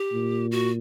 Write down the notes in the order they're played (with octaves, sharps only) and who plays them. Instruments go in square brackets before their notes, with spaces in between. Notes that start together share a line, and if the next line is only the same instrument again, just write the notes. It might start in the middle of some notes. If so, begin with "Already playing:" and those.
Already playing: [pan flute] G4
[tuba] A#2
[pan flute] F#4